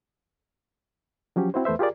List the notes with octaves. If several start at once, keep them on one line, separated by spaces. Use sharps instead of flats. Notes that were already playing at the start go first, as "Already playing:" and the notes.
F3 F#3 C#4 G4
C4 E4 F#4 C5
E2 A3 B4 C5 E5
F4 G4 G#4 A#4 D5